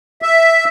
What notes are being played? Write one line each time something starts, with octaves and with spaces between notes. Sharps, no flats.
E5